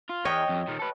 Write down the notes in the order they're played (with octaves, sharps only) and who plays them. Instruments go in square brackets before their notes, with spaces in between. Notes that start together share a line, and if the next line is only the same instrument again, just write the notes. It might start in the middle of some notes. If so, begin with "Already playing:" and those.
[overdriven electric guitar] F4
[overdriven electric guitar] E2 [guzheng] C#5 D#5 G5
[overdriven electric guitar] F2
A#2 D#3
A4 B4